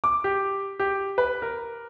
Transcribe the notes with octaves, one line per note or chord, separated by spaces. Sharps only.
D6
G4
G4
B4
A#4